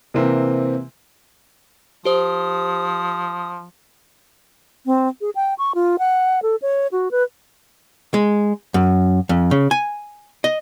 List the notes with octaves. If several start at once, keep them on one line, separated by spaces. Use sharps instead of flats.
C3 E3 A#3 C4
F3 G4 C5 D#6
C4
G#4
G5
C#6
F4
F#5
A4
C#5
F#4
B4
G#3
F#2
F2
C#3
G#5
D#5